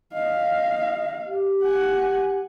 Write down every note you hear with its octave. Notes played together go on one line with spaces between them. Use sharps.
D#5 F5
G4
F#5 G#5